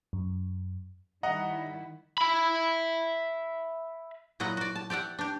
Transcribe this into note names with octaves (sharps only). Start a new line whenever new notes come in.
F#2
D#3 G3 E4 D#5 F#5 A#5
E5 B5
A#2 F#3 E4 D#5 F#5
F#4 D5
A5
G4 D5 E5 F#5
D4 G4